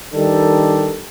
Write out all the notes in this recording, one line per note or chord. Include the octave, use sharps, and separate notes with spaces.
D#3 G3 D4 G4 A4